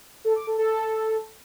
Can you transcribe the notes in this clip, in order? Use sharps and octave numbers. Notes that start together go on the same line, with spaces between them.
A4
D6
A4
A4